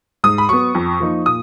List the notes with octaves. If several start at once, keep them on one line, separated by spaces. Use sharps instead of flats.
G#2 D#6
B5
F#3 B3 C#6
F2
F3 A#3 D#4
A#2 D#6